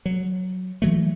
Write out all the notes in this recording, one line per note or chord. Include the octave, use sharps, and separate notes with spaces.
F#3
E3 F#3 A3